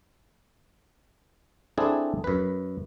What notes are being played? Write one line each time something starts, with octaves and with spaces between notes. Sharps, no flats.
C4 D4 E4 G#4 A4
F#2 B4